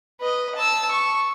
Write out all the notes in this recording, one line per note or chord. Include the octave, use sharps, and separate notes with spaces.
B4 D#5
A5 E6
C#6